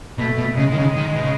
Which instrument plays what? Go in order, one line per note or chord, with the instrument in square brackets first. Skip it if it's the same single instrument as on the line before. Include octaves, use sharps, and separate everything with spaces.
[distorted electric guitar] B2 [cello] A3
[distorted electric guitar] B2
[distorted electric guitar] C#3 [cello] G#3
[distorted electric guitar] D#3
C#3
D#3
B2
C#3